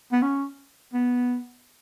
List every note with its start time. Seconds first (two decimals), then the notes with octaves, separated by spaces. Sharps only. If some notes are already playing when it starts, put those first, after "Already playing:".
0.12 B3
0.22 C#4
0.93 B3